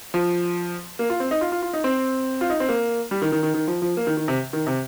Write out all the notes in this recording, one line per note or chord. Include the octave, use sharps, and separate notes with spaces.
F3
A#3
F4
C4
D#4
F4
F4
F4
D#4
C4
F4
D#4
C4
A#3
G3
D#3
D#3
D#3
D#3
F3
F3
A#3
D#3
D#3
C3
D#3
C3